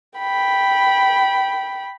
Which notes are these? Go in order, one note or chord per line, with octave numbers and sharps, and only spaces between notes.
G5 B5